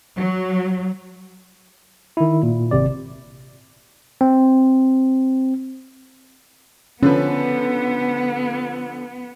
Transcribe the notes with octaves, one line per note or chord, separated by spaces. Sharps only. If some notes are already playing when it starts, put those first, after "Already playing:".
F#3
D#3 E4
A#2
G#1 C3 D5
C4
D3 F3 B3 C#4 B4